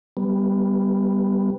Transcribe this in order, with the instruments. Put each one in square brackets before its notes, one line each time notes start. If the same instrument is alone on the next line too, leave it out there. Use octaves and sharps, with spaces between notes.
[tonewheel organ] G3 B3